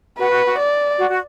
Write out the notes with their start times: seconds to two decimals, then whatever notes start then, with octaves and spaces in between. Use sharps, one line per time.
0.19 F#4 B4
0.31 F#4
0.45 F#4
0.59 D5
0.99 F#4
1.09 F#4